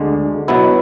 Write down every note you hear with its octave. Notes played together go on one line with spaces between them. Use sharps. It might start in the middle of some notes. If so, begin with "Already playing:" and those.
Already playing: D2 D3 G#3 D4
B2 F#3 B3 E4